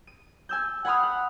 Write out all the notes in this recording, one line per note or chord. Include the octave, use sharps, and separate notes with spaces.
D#7
G#5 E6 G6
F#5 G#5 B5 C6 D#6 F6
F#5